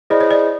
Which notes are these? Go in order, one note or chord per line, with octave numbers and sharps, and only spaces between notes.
E4 G#4 C5 D5 D#5
C#5
D5